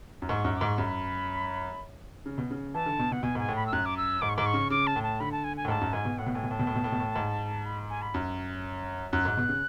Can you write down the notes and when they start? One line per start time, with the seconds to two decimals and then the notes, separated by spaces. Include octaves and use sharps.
0.22 F#2
0.29 G#2 C#6
0.45 F#2
0.57 G#2 D6
0.67 C#6
0.78 F#2 B5
2.26 C#3
2.38 B2
2.51 C#3
2.74 E3 A5
2.86 D3
2.99 B2
3.12 B2 F#5
3.23 B2 G#5
3.35 G#2 G#5
3.48 A2
3.56 B5
3.67 E6
3.73 F#2 F#6
3.86 D6
3.97 E6
4.22 G#2 D6
4.29 C#6
4.36 G#2 D6
4.46 C#6
4.54 C#3
4.70 C#3 D6
4.87 A5
4.96 A2
5.03 A5
5.20 D3 B5
5.32 A5
5.44 G#5
5.57 G#5
5.65 A2
5.68 G#2 A5
5.81 F#2
5.93 G#2 G#5
6.05 B2
6.18 A2 F#5
6.26 B2
6.35 A2 G#5
6.43 B2
6.51 A2 A5
6.59 B2
6.67 A2
6.75 B2
6.84 A2
6.92 B2
7.00 A2
7.16 G#2
7.65 B5
7.90 G#5
8.02 B5
8.14 F#2
9.13 F#2 F#6
9.25 G#2
9.37 B2
9.49 C#3